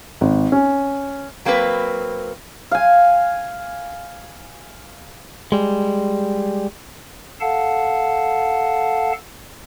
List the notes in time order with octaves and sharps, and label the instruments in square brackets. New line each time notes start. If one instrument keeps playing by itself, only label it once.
[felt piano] G#1
C#4
[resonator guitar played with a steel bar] F#3 A#3 C4 D4 B4
[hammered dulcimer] F5 G#5
[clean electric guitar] G3 G#3
[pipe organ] A4 F5 F#5 A5